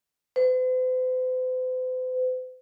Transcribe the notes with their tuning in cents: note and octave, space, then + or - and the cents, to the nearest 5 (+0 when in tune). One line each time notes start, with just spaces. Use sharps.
C5 -45